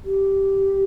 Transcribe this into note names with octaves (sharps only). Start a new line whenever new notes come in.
G4